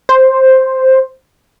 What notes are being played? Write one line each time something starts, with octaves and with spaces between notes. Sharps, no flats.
C5